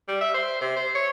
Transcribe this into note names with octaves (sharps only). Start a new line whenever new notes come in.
G3
E5
C5
C3
C5
C#5